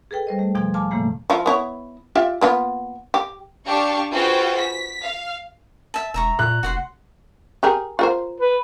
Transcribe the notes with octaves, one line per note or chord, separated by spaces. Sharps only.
G#4 A4 B4 G5
G3 C5 D#5
A3
E2 B2 F3 C6 G#6
F5 G#5 A5 C6 D6 F6
A2 C#3 E3 A3 A#3
F3 E4 F4
B3 E4 C#5
F4 G4 E5
A#3 B3 F4
G4
D4 G4 F5 A5 C#6
F4 F#4 G#4 B4 C5 G5
B6
F5
E5 A5
E1 E5 A#5 C#6
A#2 F#6
F1 F#4 F#5 C6
G4 G#4 A#4
F4 A#4 C5
B4